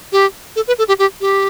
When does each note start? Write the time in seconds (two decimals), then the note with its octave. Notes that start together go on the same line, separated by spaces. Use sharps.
0.12 G4
0.56 A4
0.68 B4
0.78 A4
0.88 G4
0.99 G4
1.21 G4